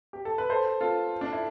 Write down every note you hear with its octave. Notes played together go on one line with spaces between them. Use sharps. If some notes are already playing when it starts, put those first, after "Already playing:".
G4
A4
B4
A4 C5
F4 A4
D4
E4